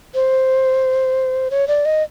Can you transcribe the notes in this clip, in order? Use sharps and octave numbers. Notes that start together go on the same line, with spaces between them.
C5
C#5
D5
D#5